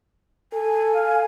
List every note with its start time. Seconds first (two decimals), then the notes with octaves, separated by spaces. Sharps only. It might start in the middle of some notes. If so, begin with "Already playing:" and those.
0.53 A4 G#5
0.95 F5